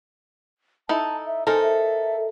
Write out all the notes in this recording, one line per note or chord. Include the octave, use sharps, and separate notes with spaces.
D#4 E4 A4 A5
E5
D#4 A4 A#4 C5 G#5
E5